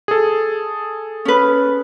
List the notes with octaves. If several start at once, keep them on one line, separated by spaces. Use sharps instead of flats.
G#4 A4
C#4 B4